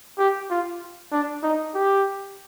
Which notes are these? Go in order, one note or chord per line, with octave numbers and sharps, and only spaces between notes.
G4
F4
D4
D#4
G4